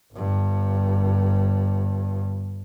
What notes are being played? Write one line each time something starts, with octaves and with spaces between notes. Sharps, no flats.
G1 G2